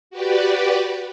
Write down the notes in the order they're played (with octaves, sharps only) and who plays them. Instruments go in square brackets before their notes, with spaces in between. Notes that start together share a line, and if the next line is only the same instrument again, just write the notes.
[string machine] F#4 G4 B4 D5